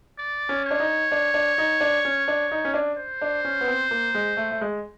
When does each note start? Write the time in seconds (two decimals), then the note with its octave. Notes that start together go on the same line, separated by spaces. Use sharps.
0.18 D5
0.49 C#4
0.65 C#5
0.71 D4
0.80 D#4
1.12 D4
1.34 D4
1.58 D#4
1.81 D4
2.05 C#4
2.28 D4
2.51 D#4
2.65 C#4
2.74 D4
2.97 C5
3.22 D4
3.45 C#4
3.61 B3
3.68 C4
3.91 A#3
4.14 G#3
4.37 A3
4.51 A3
4.61 G#3